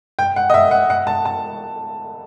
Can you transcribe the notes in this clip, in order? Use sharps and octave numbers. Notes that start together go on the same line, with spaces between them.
G5
F#5
D#5
E5
F#5
F#5
A5
A5